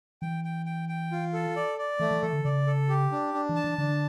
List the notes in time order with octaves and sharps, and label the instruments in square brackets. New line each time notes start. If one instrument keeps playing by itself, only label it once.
[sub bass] E3 [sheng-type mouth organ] G5
[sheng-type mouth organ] G5
G5
G5
F4
A4
D5
D5
[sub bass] E3 [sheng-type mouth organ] A3
[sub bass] E3
[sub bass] E3 [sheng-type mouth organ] A4
[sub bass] D3
[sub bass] C#3 [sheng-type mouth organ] D5
[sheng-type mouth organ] A4
G4
D4
D4
[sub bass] E3
[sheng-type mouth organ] A5
[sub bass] E3
[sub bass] D3 [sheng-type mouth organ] D4